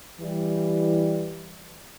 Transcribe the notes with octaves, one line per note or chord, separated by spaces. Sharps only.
E3 G3